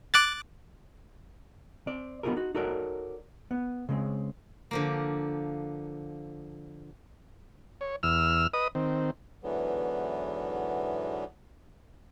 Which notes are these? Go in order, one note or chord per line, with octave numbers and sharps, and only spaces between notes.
D6 F#6 A6
C4 D5
B3 D#4 F4 G4 G#4 A#4
D#4 F#4
D#4 F#4 A4 A#4 C#5 D5
B3
C#3 G#3 C4
D3 F3 A#3
C#5
E2 E6 F6
B4 D#5 D#6
D#3 C4
E2 G#2 D3 E3 F#3 B3